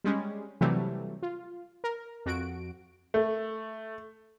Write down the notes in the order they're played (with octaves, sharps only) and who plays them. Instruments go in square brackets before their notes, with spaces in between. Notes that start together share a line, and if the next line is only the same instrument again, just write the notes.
[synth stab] G3 G#3 C#4
C3 E3 F#3 G3 A3
F4
A#4
F2 F#4 D7
[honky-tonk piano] A3